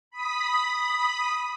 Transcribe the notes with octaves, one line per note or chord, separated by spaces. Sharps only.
B5 D#6 B6